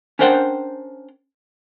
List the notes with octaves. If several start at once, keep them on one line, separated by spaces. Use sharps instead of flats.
C#4 D4 A#4 C5 F#5 G5